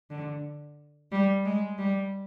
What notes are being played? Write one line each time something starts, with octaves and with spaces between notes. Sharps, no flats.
D3
G3
G#3
G3